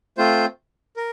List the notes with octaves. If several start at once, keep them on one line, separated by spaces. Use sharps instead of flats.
A3 C4 F4 C5
A#4